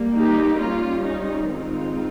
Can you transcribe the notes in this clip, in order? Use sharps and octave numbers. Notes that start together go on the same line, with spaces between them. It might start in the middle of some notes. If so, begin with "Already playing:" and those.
Already playing: G3 A#3
D#4 G4
G3 C#4 F4
D#4
D#3 G#3 C4 D#4 F4